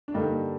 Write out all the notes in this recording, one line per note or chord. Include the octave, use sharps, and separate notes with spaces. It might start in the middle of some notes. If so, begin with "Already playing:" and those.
D4
G2 D3 G3 A#3 D#4